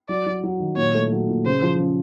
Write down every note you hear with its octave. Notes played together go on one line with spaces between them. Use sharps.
F#3 D5
F#3
F#3
D#3
A#2 C#5
A3
F#3
A#2
C#3 C5
F3
C#3